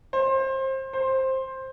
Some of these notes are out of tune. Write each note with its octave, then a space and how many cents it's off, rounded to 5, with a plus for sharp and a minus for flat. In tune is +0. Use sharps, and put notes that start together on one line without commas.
C5 +25
C5 +10